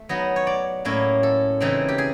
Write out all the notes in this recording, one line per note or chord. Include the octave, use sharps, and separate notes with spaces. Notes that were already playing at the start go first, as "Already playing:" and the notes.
Already playing: A3
F#3 B3 D#4 D#5
C#5
D5
A2 F#3 A#3 C#4 E4
A4
C#3 E3 G#3 C4 D#4
G4
G#4